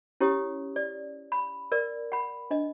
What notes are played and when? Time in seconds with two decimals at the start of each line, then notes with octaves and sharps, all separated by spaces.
0.21 C#4 E4 G4 C#5 D#6
0.76 D5
1.32 B5
1.72 A#4 D5
2.12 F#5 B5
2.51 D4 D#5